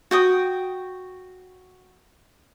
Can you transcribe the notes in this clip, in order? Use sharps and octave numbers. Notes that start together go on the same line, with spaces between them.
F#4 G5 D#6